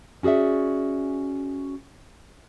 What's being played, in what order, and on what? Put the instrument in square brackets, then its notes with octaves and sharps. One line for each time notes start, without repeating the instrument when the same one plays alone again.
[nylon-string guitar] C#4 F#4 G#4 D5 E5